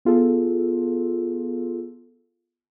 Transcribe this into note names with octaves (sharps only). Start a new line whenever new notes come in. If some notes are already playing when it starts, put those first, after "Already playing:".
B3 F4 G#4 A4